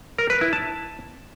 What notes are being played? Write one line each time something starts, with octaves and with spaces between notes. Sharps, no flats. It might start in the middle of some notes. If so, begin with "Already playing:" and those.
A#4
B4
E4
A5